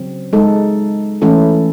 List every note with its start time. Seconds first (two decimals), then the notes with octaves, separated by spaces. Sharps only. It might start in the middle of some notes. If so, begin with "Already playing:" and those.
Already playing: C#3 F#3 C4
0.33 G#3 D#4 A4
1.22 E3 A3 C#4 E4 A4